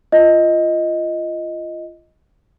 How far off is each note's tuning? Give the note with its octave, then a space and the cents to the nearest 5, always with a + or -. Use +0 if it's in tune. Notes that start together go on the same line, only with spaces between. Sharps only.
F4 -20 D#5 +5